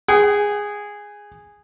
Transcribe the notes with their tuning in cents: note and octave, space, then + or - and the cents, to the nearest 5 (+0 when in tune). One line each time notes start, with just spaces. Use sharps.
G#4 -10 F#5 +45